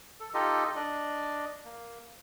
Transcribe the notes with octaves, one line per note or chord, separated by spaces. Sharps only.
A4
D#4 F4 G4 A4 D#5
D4 D5 D#5
A#3